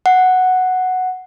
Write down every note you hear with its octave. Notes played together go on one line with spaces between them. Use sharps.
F#5